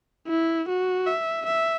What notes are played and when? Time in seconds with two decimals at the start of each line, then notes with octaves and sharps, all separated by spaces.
0.28 E4
0.68 F#4
1.07 E5
1.46 E5